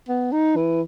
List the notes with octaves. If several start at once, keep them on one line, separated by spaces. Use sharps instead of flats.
B3
D#4
E3